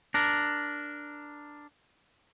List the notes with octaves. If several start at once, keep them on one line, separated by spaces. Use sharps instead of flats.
D4 A#4